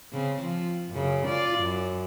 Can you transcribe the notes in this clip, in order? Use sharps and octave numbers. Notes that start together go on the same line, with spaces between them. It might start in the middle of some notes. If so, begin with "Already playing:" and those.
C#3 C4
F3
F#2 C#3
F4 D5
F#2